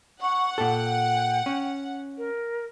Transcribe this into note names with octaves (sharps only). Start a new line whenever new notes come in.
F#5 C#6
A#2 A4 G5
C#4
A#4